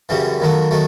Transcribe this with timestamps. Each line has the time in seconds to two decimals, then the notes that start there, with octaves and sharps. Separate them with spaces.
0.09 F#2 C#3 E3 G3
0.40 D#2 D#3 F#3 A3
0.71 D#3 F#3 A3